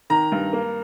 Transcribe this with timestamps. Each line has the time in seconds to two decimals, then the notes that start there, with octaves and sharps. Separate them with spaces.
0.10 D#3 A#5
0.32 G2
0.53 A#3